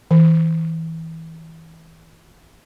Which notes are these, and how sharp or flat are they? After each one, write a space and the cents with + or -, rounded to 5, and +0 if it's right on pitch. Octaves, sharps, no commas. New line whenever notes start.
E3 -25